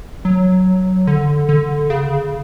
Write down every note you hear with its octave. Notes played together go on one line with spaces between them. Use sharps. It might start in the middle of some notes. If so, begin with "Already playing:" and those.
F#3
D3
D3
C#3